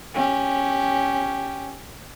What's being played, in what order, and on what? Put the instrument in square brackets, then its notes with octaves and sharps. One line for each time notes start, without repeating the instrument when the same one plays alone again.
[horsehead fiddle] C#4 G4